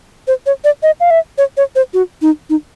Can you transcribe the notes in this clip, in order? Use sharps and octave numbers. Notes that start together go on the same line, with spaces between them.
C5
C#5
D5
D#5
F5
E5
C#5
C#5
C5
F#4
D#4
D#4